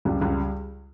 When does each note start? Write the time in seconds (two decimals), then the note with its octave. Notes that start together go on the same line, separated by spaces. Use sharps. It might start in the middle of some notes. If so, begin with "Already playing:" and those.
0.05 C#2 G3
0.21 C#2